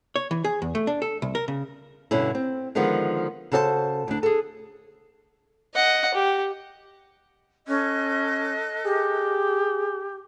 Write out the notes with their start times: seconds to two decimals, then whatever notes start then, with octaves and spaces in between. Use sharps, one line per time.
0.16 C#5
0.31 E3
0.44 G#4
0.62 E2
0.75 A3
0.87 D4
1.02 A4
1.22 C2
1.35 A#4
1.48 C#3
2.11 G2 B2 D3 C#4 D4 E4
2.35 C4
2.75 D3 D#3 F3 G#3 B3
3.52 C#3 F#4 A4 C5 C#5 A5
4.08 D2 D4
4.23 G#4 A4
5.75 D#5 F#5
6.14 G4
7.68 C#4 A4 D#5 F#6
8.85 G4 G#4